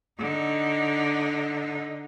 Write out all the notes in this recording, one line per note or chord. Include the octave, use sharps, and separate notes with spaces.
D3 D#4